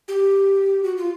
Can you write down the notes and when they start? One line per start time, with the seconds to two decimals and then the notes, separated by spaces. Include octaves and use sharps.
0.08 G4
0.84 F#4
0.97 F4